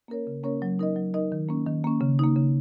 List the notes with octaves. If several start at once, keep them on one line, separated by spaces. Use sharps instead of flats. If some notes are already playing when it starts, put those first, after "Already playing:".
A#3 C#4 A#4 C#5
C#3
A#3 C#4 A#4 C#5
F#3
D#4 A#4 D#5
F#3
D#4 A#4 D#5
D#3
A#3 C#4
D#3
A#3 C#4
C#3
A#3 D#4
C#3